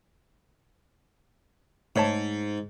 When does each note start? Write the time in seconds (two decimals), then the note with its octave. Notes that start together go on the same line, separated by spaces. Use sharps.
1.96 G#2 A3 C#5 A5